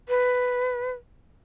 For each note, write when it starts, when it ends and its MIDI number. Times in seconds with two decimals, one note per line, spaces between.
0.09 0.91 71